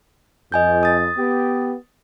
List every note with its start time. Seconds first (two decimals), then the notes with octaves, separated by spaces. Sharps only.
0.52 F2 D#5 G#5 G6
0.83 D#6 A6
1.16 B3 G4